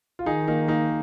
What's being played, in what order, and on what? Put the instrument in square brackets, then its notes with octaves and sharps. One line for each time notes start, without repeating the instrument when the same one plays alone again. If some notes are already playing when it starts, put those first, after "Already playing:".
[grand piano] F4
[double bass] D#3 [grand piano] D#4 G#4
[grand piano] A#3 D#4
A#3 D#4